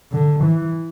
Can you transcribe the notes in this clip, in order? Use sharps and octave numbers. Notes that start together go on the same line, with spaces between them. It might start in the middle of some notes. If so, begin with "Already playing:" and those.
D3
E3